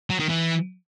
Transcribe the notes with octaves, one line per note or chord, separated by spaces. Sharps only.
F#3
D#3
E3